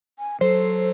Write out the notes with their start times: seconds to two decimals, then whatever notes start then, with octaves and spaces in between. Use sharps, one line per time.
0.19 G#5
0.41 F#3 A4 C5